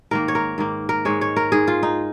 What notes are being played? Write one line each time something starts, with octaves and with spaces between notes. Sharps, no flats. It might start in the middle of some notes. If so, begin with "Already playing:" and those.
G#2 D#3 A#3 A#4
C#5
A#4
G#2 D#3 A#3
A#4
G#2 G#3 C#5
C#5
A#4
G#2 G#3 G#4
F4
D#4